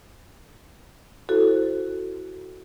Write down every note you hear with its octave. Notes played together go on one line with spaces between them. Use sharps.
E4 F#4 A4 C5